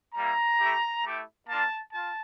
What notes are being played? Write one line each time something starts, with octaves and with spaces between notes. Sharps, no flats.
G3 A#3 E4 A#5
A3 E4 G4
A3 E4 G4
A#3 D4 F4 A5
F4 A5